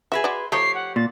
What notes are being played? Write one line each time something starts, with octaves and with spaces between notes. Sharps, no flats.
F#4 G#4 B4 E5
F#4 D5 C6
F3 A3 D#4 G4 C#5 C7
F#5
A#2 A6